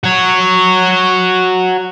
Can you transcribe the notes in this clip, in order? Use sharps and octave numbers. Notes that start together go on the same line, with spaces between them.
F#4 C#5